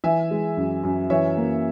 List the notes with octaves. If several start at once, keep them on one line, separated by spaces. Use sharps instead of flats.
E3 E5 G#5
G#3
F#2
F#2
E3 C#5 E5
A#3